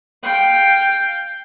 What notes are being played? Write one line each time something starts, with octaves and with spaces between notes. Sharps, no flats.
F5 G5